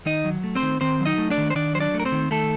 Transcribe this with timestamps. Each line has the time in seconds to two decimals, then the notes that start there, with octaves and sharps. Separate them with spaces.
0.05 D#3 D#4 D#5
0.25 F#3
0.44 A3
0.55 C4 C5
0.63 D#3
0.81 D#3 C4 C5
1.00 F#3
1.05 D#4 D#5
1.18 A3
1.30 D4 D5
1.37 D#3
1.50 C5
1.55 D#3 D4 D5
1.75 F#3 C5
1.80 D4 D5
1.94 A3
2.00 A#4
2.05 C4 C5
2.12 D#3
2.31 D#3 A3 A4